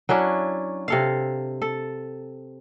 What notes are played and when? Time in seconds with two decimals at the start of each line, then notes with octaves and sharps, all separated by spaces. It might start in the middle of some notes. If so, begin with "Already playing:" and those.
0.09 F#3 C#4 D4 E4
0.88 C3 A4 F5
1.62 A4